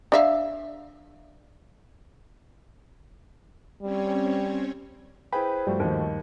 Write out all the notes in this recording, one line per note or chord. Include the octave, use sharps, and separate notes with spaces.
D4 E5 F5
G3 C4 C#4 C#5
E4 G#4 B4 C5 G5 B5
G2 F3 G3 A3 F#4
D#2 D#3